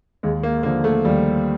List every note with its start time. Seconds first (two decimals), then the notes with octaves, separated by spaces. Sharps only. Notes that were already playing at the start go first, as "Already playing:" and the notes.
0.23 D#2 G#3
0.43 A#3
0.63 D3 F3 A#3
0.84 A3
1.05 D#2 G3